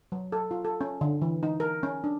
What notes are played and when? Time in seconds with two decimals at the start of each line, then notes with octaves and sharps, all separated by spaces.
0.12 F#3
0.32 A4
0.51 F4
0.65 A4
0.81 C#4
1.01 D3
1.22 E3
1.43 D#4
1.60 A#4
1.83 C#4
2.04 D4